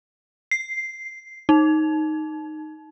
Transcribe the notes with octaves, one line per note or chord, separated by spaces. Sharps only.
C7
D#4